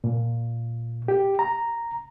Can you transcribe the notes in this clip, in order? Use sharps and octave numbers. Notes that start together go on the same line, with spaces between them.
A#2
G4
A#5